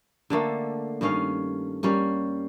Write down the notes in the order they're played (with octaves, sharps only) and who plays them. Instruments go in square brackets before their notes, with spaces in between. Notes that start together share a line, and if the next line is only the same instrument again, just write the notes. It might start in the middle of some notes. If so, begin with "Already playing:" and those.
[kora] D3 A3 A#3
G2 D#3 C#4 F5
G3 A#3 C#4